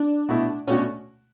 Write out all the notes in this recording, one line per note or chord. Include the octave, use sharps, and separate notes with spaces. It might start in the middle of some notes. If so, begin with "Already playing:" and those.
Already playing: D4
B2 A3 E4
B2 A3 C#4 D4 F#4